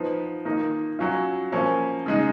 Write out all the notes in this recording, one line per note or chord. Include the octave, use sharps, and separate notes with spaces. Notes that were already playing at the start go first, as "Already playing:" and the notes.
Already playing: F3 B3 D#4
D#3 A#3 D#4
F#3 C#4 F4
F3 A#3 C#4
C#3 G#3 D#4